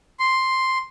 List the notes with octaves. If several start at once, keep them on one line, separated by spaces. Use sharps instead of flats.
C6